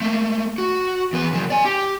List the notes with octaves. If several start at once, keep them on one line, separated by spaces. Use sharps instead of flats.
A3 A#3
F#4
E2 B4
C#3 F#3
D5 G#5
G4